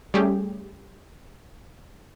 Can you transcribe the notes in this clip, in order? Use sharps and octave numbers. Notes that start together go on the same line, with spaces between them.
G3 A3 C#4 G4 G#4